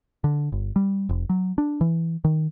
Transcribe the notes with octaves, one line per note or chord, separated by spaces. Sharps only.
D3
G1
G3
F1
F#3
D4
E3
D#3